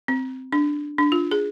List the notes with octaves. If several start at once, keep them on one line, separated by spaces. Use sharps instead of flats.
C4
D4
D4
F4
G#4